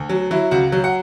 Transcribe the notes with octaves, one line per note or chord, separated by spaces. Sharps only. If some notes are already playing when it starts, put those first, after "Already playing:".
Already playing: D2
F#3
F#3 E4
C#2 F#4
F#3
F#5